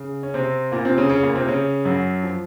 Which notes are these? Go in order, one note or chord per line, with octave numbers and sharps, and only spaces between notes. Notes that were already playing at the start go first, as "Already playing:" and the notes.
Already playing: C#3
C#4
C3 C4
A#2 A#3
C3 C4
C#3 C#4
C#3 C#4
A#2 A#3
C3 C4
C#3 C#4
F#2 F#3
F3